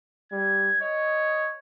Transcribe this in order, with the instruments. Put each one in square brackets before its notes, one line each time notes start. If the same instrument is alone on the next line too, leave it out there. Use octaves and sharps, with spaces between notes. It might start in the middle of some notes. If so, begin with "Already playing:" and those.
[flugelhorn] G3 [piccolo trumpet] G#6
[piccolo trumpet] C#5 [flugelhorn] D#5